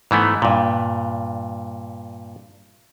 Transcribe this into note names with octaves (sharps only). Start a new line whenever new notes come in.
G#2 E3 A3 B3
G2 A#2